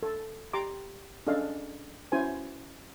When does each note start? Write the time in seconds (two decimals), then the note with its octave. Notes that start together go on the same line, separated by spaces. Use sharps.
0.03 A4
0.53 G4 A#5 C6 D6
1.27 C#4 D4 G#4 A4 D#5 F5
2.12 C#4 E4 F#4 C5 G#5